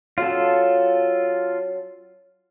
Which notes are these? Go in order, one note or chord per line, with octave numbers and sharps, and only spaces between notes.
F#3 C#4 F4 A4